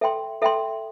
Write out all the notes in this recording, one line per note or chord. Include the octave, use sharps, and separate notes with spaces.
A4 E5 G5 C6
A4 E5 G5 C6